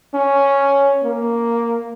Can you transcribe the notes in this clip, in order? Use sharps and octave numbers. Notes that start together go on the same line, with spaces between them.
C#4
A#3